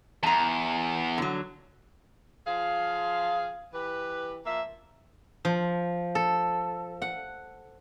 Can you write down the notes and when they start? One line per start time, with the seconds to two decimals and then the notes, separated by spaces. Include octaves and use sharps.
0.23 E2 A5 A#5
1.18 D3 F#3
2.47 F3 F4 G#4 F5
3.74 E3 G4 B4
4.46 F3 A#3 E5
5.45 F3
6.15 A4
7.02 F#5